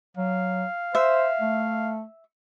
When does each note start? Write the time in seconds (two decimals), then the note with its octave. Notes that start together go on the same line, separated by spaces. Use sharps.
0.17 F#3 F5
0.95 C5 E5
1.41 A3